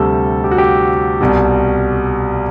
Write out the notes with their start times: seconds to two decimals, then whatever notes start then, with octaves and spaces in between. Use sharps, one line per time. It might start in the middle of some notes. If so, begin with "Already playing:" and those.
Already playing: D2 C3 G3 A4
0.44 G4
0.51 F#4
0.58 G4
1.21 C2 B2 G3